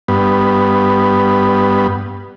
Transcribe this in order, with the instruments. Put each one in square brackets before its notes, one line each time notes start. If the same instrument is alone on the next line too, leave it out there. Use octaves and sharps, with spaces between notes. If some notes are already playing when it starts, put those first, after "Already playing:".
[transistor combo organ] G2 B3